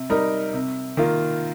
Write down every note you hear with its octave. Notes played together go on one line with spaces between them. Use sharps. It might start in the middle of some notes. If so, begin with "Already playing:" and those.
Already playing: C3
G3 D#4 A#4
C3
D#3 A#3 F4 A#4